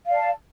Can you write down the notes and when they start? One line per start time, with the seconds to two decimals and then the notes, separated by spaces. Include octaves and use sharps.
0.06 F5
0.10 D5
0.15 A5